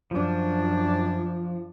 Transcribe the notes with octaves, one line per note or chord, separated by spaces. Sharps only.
F#2 F3 D4